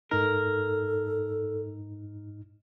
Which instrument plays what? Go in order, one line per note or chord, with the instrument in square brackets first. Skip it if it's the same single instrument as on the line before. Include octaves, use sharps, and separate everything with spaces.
[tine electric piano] G#2 D#4 [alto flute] A4 [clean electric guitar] A#4